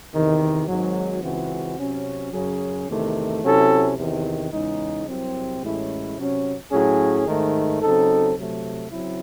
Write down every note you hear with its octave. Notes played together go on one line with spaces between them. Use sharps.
E2 C3 D#3
G#1 G#2 F#3
C#2 C#3 E3 C4 F#4
C3 F#3 C#4
F#2 C#3 F#3 C#4 G#4
E2 C3 D#3 A3
C3 F#3 C#4 E4 A4
E2 C3 D#3
E2 C#3 G#3 D#4
C2 C3 F#3 C4
A1 A2 G#3 C#4 E4
C3 F#3 C#4
A2 F#3 C#4 G#4
G#2 D#3 A3
C#3 F#3 C4 D#4 A4
C3 F#3 A3
C#3 F#3 C4 E4